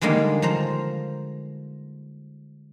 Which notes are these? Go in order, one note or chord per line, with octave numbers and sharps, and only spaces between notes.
D3 D#3 G3 G#3 A#3
F3 C5 A#5